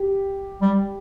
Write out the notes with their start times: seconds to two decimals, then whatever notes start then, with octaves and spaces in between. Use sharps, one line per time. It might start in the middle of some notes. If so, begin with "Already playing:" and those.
Already playing: G4
0.62 G3